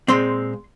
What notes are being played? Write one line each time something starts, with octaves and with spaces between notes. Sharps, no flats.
A#2 G#3 C4 C6